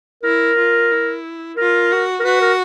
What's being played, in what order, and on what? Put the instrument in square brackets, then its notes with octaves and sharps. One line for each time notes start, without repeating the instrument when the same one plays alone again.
[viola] E4 [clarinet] A#4
[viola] F4
E4
[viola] F4 [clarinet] A#4
[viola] F#4
[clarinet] A#4
[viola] F#4 [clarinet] B4
[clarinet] A#4